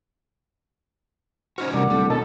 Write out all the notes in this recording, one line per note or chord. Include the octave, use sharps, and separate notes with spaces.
C#4 D#4 F#4 C5 F6
A1 C3 G3 A#4 D5 F#5 D6
D1 G3 A4
D#2 B2 D#3 A4 A#4 D#5 A5